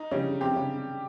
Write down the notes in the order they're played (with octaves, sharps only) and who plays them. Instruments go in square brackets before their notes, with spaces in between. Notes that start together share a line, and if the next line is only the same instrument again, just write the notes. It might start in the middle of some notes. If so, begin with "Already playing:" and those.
Already playing: [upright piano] D#4
[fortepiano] C#3 C#4 [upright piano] G3
[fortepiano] C3 C4 [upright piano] G4
[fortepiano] C#3 C#4